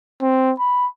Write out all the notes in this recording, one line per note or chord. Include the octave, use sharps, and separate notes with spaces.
C4
B5